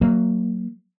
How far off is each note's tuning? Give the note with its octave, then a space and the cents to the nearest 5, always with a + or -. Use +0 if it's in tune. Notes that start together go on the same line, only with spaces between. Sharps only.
F#3 +5 A#3 -20